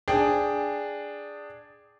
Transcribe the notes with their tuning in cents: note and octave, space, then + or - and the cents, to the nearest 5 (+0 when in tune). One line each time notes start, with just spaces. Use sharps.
D4 +0 G#4 -5 G5 +0